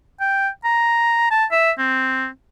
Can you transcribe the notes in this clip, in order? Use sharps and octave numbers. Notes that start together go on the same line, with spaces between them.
G5
A#5
A5
E5
C4